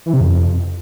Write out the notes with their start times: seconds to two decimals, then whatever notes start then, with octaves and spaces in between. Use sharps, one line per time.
0.06 E3
0.13 C3
0.21 F2